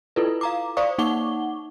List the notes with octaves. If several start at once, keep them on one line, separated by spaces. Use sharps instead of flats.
E4 F4 A4 B4
F5 A#5 D6
C5 D5 F5 C#6 D#6
A#3 D#4 F#5 C#6 D6 G7